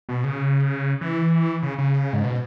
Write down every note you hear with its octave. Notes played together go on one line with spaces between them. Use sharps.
B2
C#3
E3
C#3
C#3
G#2
B2